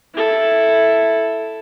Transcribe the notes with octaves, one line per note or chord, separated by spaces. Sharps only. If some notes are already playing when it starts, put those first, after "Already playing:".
E4 A4